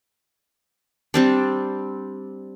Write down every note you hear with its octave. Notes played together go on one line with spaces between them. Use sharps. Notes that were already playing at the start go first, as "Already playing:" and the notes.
G3 C4 D4